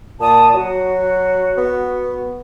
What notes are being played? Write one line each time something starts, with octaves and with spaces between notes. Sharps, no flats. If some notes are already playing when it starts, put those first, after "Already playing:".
A#2 D5 A5 D#6
F#3 F#4
B3